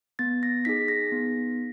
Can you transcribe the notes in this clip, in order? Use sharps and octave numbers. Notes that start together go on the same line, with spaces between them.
B3 A6
A#6
D#4 G#4 B6
A#6
B3